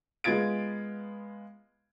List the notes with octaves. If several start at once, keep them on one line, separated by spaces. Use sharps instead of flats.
G#3 B3 F4 G#6 A6 D7